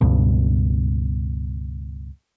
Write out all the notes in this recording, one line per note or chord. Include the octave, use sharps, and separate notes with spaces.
C#2 G2 B2